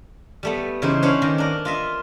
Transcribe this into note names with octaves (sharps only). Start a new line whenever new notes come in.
G3 A3 B3
C#3 E3 D#4 C5
C#4 D4 C5 C#5 F5
D#3 A#3
D4 A#4
F4 D#5 E5